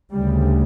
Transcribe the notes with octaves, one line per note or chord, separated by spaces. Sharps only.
D2 C#3 G3